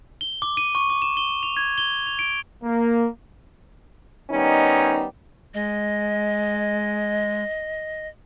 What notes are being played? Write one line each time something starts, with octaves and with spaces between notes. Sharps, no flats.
G7
D6
D#7
C#6
D6
E7
G7
F7
G#6
G7
F7
D7
A#3
D#3 G3 B3 C#4 D#4
G#3 D#5